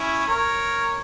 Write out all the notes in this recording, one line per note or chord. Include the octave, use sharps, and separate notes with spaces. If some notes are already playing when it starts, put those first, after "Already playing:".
Already playing: C#4 E4
A#4 C#5